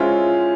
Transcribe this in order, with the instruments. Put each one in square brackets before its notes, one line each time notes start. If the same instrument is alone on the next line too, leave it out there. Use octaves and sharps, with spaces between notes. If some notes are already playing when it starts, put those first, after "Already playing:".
Already playing: [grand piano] G#3 C#4 E4 G#4 C5 [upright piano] F4